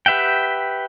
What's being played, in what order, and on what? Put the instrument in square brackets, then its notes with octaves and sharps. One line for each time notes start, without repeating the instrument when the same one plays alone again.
[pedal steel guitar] G4 B4 E5 F#5 G5